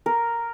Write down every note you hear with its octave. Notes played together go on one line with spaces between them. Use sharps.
A#4